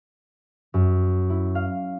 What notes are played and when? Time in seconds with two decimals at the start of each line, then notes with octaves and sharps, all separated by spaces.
0.74 F#2
1.30 E4
1.55 F5